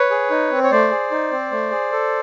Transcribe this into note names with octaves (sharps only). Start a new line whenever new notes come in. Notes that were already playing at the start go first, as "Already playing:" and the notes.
Already playing: B4 C#5
G#4
D#4
C4
C#5
A3 C5 D5
G#4
D#4
C4
A3
G#4
A4